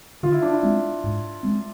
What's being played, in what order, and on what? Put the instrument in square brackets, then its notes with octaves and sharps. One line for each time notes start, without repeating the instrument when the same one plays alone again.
[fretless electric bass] D3 [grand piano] F4
[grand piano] E4
D4
E4
[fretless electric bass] G#3 C4
G#2
G#3 C4